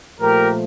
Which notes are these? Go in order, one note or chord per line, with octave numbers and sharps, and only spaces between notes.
A#2 F3 A3 G4 A#4